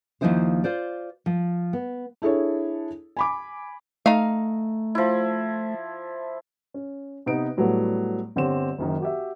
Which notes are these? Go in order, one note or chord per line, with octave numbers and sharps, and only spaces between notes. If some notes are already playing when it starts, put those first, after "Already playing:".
D#2 A#2 F3 D#4 E4 C5
F4 C5 D5
F3
B3
D4 E4 G#4 A4 C#5
G#5 B5 D6
A3 D#4 F5
F3 E4
C#4
C3 B3 D#4 B4 D7
A2 F#3 G3 A3 B3
G1 D3 C4 G4 C#5 E7
F#1 F#2 D#3
F#4 G4 E5